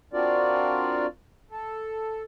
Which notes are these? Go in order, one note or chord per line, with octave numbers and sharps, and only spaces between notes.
C4 D4 F4 F#4 A#4 D5
A4